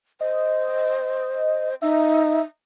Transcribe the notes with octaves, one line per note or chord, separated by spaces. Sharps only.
C5 D#5
D#4 E5